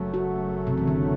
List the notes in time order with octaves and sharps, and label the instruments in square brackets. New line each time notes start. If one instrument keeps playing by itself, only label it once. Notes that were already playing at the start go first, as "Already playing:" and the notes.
Already playing: [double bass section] F#1 F#2 F#3 A3
[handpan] F#4
C3
E3
D3